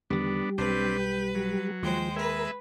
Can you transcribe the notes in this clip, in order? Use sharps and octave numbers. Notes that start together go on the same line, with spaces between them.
E2 D3 D#3 G3 B3 D4
B1 C4 D4 G4 B4
G5
F#3
D#2 F3 G#3 C5 G5
G#3 A#4 B4 E5